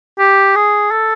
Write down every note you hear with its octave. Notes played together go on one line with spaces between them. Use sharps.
G4
G#4
A4